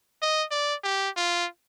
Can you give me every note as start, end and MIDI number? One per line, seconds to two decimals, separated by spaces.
0.22 0.44 75
0.51 0.75 74
0.84 1.09 67
1.16 1.46 65